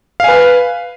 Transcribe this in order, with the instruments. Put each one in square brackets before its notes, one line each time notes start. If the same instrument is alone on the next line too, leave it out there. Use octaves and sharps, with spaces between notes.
[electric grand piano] F5
G#5
B4